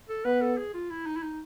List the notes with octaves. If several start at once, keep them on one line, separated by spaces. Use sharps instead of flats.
A4
B3 B4
A4
G#4
F4
E4
D#4
E4
D#4